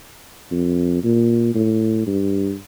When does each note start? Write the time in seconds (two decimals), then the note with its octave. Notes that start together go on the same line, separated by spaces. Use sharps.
0.51 F2
1.04 A#2
1.55 A2
2.07 G2